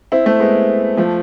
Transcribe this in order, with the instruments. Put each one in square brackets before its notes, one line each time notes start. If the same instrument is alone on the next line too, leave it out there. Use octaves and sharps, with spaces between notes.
[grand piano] C4 E4
A3 C4
G#3 B3
F3 A3